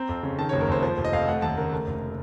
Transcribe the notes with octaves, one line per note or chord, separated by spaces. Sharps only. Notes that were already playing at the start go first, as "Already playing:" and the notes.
Already playing: C4 A#5
F2
C#3
D#3 A5
F#1 C#5
A#4
F2 C5
F3 C5
F1
D#5
F2 F5
A3 F#5
D#2 A5
C#3 A#4
A3
F1